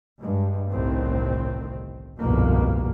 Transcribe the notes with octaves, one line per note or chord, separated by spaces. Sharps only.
G2 G#3
G1 C2 A2 D#3 C4
G1 C2 F2 G#2 B2 A#3